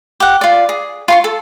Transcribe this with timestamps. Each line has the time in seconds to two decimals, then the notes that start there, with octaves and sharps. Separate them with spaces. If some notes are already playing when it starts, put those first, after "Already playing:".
0.20 G4 F#5
0.41 F4 D5
0.69 G#4
1.08 F4 C6 C#6
1.24 A4